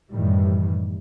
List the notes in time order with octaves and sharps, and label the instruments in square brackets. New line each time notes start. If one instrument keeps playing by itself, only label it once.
[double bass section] F#2 A2 D#3 E3 G3